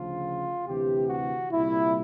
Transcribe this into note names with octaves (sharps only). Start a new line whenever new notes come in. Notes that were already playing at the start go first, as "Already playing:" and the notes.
Already playing: D2 C#3 F3 F4
D2 C3 E3 G4
F#4
C2 A#2 G3 E4